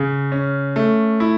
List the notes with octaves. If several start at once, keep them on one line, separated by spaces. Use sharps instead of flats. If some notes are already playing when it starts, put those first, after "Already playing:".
Already playing: C#3
C#4
A3
E4